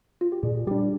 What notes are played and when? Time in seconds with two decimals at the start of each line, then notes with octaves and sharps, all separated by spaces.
0.21 F4
0.32 G4
0.43 A#2 G#4
0.67 G3 D4 G4